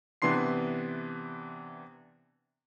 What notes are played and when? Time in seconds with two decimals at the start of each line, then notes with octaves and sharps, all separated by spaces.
0.22 C3 E3 B3 D4 C6 C7